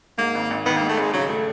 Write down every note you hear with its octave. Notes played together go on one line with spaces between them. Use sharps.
G#2 A#3
G#1
G#1
D#3 B3
A#3
G#2
A3
G#1 G#3
C#3 F#3
A3